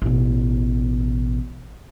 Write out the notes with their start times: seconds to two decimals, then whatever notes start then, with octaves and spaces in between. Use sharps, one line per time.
0.02 A1 B2